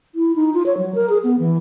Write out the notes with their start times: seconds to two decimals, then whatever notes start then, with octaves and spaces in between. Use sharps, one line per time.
0.15 E4
0.36 D#4
0.54 F4
0.66 C#5
0.77 F#3
0.95 A#4
1.09 G#4
1.24 B3
1.39 E3